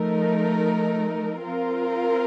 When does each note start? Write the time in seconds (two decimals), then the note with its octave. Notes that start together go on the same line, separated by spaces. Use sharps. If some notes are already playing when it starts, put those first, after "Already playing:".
Already playing: F3 A3 D#4 A#4
1.45 C4 F4 A#4